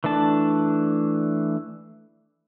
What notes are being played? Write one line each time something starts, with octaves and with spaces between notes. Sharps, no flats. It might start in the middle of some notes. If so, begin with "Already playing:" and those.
E3 A3 D4 A5